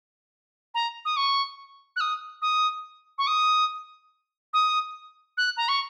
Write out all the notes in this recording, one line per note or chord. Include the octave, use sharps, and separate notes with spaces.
A#5
D#6
C#6
F#6
D#6
D#6
C#6
D#6
D#6
F#6
A#5
C#6